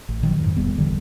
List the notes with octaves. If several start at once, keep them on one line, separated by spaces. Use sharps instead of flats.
A1
A#2 D#3 F3 F#3
F2 G#2
E1 E2 G3 B3
G1 D3 E3 G3